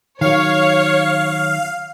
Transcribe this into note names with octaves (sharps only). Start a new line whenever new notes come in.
D#3 F#3 C#5 F5